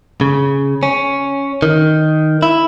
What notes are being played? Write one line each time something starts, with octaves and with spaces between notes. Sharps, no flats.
C#3
C#4
D#3
E4